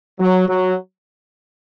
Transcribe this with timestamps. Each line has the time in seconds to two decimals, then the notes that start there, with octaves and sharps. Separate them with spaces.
0.20 F#3
0.48 F#3